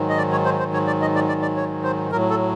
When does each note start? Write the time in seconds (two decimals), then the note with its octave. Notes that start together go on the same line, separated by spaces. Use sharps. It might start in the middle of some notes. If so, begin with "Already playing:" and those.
Already playing: G#2 D#3 F#3
0.09 D#5
0.18 D5
0.32 C#5
0.45 C5
0.59 C5
0.73 C#5
0.87 D5
1.01 D#5
1.15 D5
1.29 D5
1.42 D5
1.57 C#5
1.83 C5
2.11 A2 F#3 A#4
2.30 A4